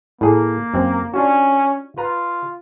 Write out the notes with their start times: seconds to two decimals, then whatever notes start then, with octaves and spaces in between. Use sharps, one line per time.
0.21 A2 A#3 G#4 A4
0.74 F#2 C4
1.14 C#4 D4 F4 F#4
1.98 F4 B4 A#5